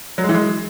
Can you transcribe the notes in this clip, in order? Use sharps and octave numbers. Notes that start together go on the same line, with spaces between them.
F#3
G#3
E3
G#3